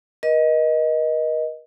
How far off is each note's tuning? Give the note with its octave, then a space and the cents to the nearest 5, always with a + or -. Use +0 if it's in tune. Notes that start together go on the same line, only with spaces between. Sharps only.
A#4 +45 D#5 +5